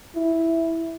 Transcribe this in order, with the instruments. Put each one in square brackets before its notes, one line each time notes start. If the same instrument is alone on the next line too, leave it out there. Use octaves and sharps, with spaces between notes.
[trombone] E4